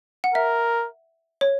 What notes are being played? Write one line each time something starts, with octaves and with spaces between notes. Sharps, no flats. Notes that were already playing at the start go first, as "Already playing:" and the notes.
F#5
A#4 E5
C#5